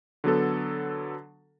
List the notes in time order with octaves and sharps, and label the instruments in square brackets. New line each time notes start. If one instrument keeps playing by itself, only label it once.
[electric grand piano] D3 F#3 B3 A4